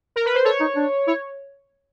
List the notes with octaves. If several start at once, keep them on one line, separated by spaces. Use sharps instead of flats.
A#4
B4
C5
A4 C#5
D#4
D4
E4 C#5